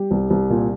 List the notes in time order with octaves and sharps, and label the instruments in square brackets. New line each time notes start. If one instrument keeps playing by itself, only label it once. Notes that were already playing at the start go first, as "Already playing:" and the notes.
Already playing: [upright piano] G3 G4
C2
C2
A#2